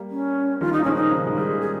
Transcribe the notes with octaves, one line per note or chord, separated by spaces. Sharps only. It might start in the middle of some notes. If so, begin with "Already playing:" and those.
Already playing: G3 A#3
C#4
D#3 G3 F4
D#4
A#3
F3 G#3 C#4
D#4
C#3 F3
G#3
D#3 G3 G#4
G#4